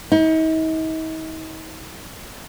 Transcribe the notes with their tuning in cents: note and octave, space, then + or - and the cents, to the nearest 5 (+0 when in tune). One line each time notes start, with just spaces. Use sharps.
D#4 +40